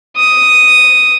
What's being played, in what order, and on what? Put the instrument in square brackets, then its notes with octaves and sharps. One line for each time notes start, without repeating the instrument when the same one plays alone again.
[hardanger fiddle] D#6